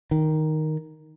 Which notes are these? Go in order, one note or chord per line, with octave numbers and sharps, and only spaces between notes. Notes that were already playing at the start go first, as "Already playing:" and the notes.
D#3